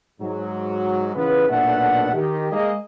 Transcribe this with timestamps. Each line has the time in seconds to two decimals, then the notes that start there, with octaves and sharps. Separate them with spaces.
0.20 G#2 F#3
1.15 C#3 E3 B3 F4 B4
1.49 B1 A#2 A3 B3 D4 F#5
2.13 D#3 G4
2.52 G#3 A#3 G#4 D#5